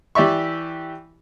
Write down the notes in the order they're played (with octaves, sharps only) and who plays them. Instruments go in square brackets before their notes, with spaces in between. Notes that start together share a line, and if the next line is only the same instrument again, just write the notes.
[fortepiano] E3 G4 D5 E5 C#6